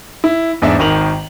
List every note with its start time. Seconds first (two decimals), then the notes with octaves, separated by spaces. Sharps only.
0.24 E4
0.62 E2 G#2 D4 D5 E5
0.79 G#1 D#3 F7 F#7